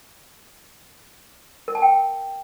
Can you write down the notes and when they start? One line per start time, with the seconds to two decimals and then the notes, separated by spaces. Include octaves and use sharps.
1.68 A#4
1.75 A5
1.82 G5